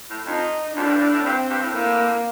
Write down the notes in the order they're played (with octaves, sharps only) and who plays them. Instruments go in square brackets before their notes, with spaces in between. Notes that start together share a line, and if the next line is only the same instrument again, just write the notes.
[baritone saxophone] A2
[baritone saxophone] F2 [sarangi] D#4
[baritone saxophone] F2 [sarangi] D4
[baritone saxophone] A2
G2
A2
A2
[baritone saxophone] G2 [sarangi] C4
[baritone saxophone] G2
A2
[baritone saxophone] A2 [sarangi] A#3